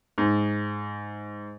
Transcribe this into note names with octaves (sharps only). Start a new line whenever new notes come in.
G#2